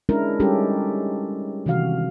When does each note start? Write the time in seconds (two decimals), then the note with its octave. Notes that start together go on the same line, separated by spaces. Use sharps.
0.09 G#3 C#4 D4 E4 A#4
0.40 G3 G#3 C#4 D#4 G4 A4
1.66 C3 D#3 E3 F#4 F5